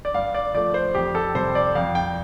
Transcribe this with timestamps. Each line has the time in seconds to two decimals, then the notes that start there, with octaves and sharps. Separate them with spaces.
0.05 D5
0.14 G2 F5
0.34 D5
0.54 F3 A3 D5
0.74 C5
0.95 F2 G4
1.15 A4
1.35 C3 G3 C4 C5
1.55 D5
1.75 F2 F5
1.95 G5